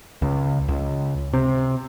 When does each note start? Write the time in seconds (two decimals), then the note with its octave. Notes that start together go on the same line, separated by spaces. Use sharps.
0.22 C#2
0.68 C#2
1.33 C3